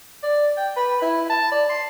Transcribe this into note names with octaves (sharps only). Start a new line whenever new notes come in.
D5
G5
B4
E4
A5
D5
C6